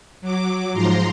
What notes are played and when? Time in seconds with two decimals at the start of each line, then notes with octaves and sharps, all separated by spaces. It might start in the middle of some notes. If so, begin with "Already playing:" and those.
0.21 F#3 D6
0.73 G#2 F3 A#5 C6